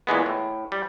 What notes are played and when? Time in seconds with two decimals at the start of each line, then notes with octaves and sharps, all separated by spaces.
0.07 A#2 E3 G#3 B3
0.26 A2
0.72 G3